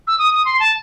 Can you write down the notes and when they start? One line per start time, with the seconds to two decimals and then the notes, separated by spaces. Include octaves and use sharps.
0.07 E6
0.19 D#6
0.34 D#6
0.45 C6
0.60 A5